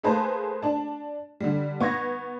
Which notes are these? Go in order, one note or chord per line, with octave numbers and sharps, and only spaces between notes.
A3 A#3 G#4 B4 C5 A5
D4 A5
D3 G3
B3 C#6 G#6 A#6